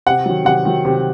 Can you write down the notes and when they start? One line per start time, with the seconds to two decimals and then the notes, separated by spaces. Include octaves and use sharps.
0.06 C3 F#5
0.26 D#3 F#3
0.45 C3 F#5
0.65 D#3 F#3
0.85 C3